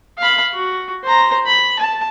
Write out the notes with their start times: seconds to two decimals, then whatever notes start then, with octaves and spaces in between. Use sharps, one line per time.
0.19 F5 B5
0.54 F#4
1.04 C5 A#5
1.47 B5
1.79 A5